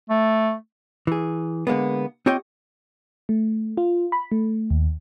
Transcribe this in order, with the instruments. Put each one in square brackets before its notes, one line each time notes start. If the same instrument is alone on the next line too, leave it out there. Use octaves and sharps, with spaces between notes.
[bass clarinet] A3
[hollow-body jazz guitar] E3 G#4
D3 G#3 A#3 B3
C4 F4 G4 C#5 D#5 G5
[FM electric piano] A3
F4
B5
A3
D#2